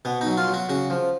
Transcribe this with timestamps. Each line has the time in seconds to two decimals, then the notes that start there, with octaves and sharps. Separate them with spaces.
0.05 B2 B3
0.21 D#4
0.27 F#3
0.38 F4
0.48 F#3
0.54 F#4
0.69 C#3 F#4
0.90 F3